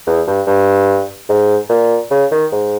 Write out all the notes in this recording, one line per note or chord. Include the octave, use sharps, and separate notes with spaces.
E2
G2
G2
G#2
A#2
C#3
D#3
G#2